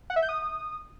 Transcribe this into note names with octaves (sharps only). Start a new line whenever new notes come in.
F#5
E5
G6
D#6